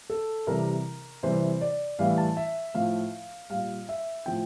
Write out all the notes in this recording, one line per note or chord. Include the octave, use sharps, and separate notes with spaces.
A4
C3 E3 G3 A#4
C3 E3 G3 C5
D5
A2 E3 G3 F5
A5
E5
A2 F3 F5
A#2 G3 F5
E5
A2 F3 G5